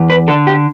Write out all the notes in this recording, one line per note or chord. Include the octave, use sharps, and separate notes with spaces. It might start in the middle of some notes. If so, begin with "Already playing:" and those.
Already playing: E2
B4
D3 A4
G4